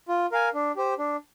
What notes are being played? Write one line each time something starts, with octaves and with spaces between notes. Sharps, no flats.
F4
A#4 F5 G#5
D4
G4 C5
D4